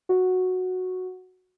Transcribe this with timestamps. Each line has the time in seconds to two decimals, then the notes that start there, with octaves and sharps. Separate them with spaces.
0.09 F#4